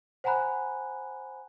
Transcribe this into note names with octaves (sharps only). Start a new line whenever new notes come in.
C5 F#5 G#5 A#5 B5 F#6